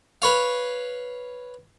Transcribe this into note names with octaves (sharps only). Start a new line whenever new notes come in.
B4 C#5 F5